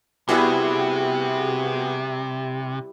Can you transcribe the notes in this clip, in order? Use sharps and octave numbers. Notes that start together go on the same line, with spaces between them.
C3 G3 B3 E4 F#4 G#4 B4